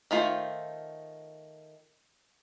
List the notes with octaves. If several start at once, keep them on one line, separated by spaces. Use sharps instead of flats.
D#3 A3 F4 C5